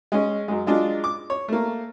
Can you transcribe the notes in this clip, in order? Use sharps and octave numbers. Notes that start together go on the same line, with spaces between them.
G#3 C#4
F#2 G#3
F#3 G#3 D4 F4
D6
C#5
A3 A#3